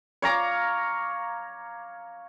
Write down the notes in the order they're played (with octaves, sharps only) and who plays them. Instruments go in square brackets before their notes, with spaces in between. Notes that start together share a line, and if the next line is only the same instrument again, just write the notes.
[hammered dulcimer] C#5 F5 A#5 D6